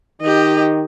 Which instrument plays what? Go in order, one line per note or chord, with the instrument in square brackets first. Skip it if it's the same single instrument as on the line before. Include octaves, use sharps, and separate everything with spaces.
[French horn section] D#3 D#4 [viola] G4 D#5